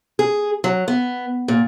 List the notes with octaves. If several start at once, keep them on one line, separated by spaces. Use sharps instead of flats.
G#4
F#3
B3
A#2